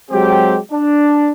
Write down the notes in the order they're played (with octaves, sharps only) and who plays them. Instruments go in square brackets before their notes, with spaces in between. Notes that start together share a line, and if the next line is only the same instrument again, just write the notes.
[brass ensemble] F#3 G#3 C4 G4
D4